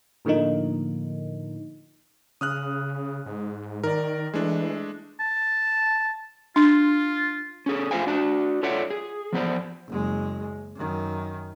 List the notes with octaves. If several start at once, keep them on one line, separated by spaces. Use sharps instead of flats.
A2 D3 F3 A#3 D#4
C#3 D#6 F6 F#6
G#2
D#3 A#4 D5
E3 G#3 A3 D4
A5
D4 F4
C#4 D#4 G#4 A4
F4 F#4 C5 F5 G#5
D4 F#4 D5 A5
F4 A4 C#5 D5 E5 F#5
G#4
F3 B3 C5 D5
F#1 G#3
F#2 D#3